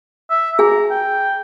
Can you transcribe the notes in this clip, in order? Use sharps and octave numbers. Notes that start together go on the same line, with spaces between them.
E5
G#4 G#5 A#5
G5